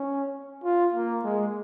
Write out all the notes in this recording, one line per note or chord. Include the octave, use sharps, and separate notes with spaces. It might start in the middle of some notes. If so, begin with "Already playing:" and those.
Already playing: C#4
F4
A#3
G#3